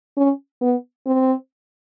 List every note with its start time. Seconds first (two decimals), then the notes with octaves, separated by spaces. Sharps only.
0.17 C#4
0.61 B3
1.06 C4